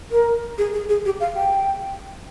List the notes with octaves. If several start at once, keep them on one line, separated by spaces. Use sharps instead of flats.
A#4
G#4
G#4
G#4
G4
F5
G5